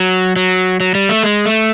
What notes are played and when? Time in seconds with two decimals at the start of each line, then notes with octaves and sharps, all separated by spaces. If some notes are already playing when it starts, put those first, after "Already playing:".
Already playing: F#3
0.36 F#3
0.80 F#3
0.95 G3
1.09 A3
1.24 G#3
1.46 A3